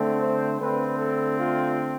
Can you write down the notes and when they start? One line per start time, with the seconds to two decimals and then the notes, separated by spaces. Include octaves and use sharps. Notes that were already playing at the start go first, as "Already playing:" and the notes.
Already playing: D3 A3 C4
0.21 C5
0.60 D3 A3 C4 B4
0.99 A4
1.39 F4